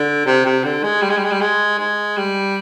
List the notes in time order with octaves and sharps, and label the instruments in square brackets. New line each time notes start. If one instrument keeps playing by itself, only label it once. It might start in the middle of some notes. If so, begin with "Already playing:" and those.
Already playing: [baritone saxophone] D3
C3
C3
D3
G#3
G3
G#3
G3
G#3
G3
G#3
G#3
G3